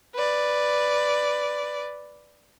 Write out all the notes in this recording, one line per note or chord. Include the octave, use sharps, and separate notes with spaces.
B4 D5